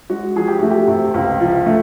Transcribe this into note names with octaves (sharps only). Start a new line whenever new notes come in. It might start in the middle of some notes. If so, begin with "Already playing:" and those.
G#3 F#4
F3 G#4
G4
A3 F#4
G4
C3
C#2
F3
A3